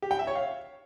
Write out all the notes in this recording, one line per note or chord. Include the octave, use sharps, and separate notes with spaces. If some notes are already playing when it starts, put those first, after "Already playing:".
G4
G5
E5
C#5
F5